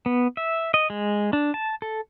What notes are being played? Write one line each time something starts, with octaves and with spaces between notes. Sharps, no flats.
B3
E5
D#5
G#3
D4
A5
A4